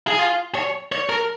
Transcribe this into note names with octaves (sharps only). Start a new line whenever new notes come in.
G#4
F4
C#5
C#5
A#4